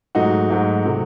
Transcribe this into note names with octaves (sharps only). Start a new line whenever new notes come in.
G#2 F#3 A3 D#4 F#4
G#2 F#3 A3
C3 F#3 A3